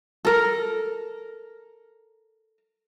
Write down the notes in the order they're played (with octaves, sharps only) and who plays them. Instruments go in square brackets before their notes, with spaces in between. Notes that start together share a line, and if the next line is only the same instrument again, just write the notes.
[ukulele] A4 A#4